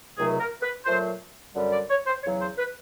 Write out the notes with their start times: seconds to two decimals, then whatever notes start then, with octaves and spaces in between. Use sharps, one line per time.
0.17 C#2 C3 D#3 F#3 A3 G#4
0.39 A#4
0.62 B4
0.85 A#2 F#3 A3 C5
1.54 F#2 D3 G3
1.72 D5
1.90 C#5
2.06 C5
2.23 E2 C#3 F#3 C#5
2.41 C5
2.58 B4